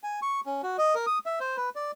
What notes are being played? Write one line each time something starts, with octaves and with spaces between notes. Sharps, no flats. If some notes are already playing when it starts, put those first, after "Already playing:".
G#5
C#6
C#4
F#4
D#5
A#4
D#6
E5
C5
B4
D5